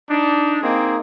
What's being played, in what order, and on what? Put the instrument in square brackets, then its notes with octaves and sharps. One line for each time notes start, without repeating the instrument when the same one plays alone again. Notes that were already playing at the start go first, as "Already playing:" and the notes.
[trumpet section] D4 D#4
A#3 C4 D#4 G#4